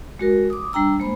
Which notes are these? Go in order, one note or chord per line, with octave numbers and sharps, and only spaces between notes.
G#3 F#4 A#4
D6 D#6
G3 D4 G5 A#5 E6
G#3 A#3 C5 B5